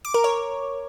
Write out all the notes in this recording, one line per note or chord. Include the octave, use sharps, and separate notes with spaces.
D6
A#4
C#5